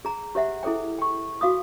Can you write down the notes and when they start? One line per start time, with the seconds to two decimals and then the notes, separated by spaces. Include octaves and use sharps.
0.05 G#4 A#5
0.35 G4 C5 E5 F#5
0.63 E4 G#4 A4 C5 G5
0.99 G5 C#6
1.41 F#4 F5 D6 D#6